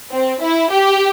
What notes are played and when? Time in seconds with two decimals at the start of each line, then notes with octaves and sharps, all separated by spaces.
0.12 C4
0.42 E4
0.71 G4